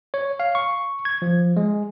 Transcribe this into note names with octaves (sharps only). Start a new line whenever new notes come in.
C#5
F5
C#6
G#6
F3
G#3